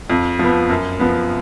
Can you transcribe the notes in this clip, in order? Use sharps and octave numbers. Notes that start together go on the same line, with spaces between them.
F2
F3 B3
F#2
F3 B3